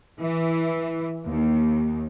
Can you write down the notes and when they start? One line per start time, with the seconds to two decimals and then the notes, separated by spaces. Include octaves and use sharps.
0.18 E3
1.26 D#2